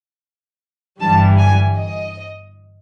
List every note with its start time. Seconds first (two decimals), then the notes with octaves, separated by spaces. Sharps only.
1.00 G1 G2 E3 G3 A5
1.38 G#5
1.77 D#5